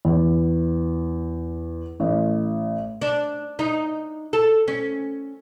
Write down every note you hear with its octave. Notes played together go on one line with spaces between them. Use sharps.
E2
A1
D4
D#4
A4
C#4